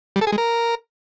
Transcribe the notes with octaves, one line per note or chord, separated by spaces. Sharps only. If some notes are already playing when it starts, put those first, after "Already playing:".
G3
A4
G#4
G#3
A#4